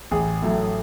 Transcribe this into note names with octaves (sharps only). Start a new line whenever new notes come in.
A1 G#4
A2 F#3 A3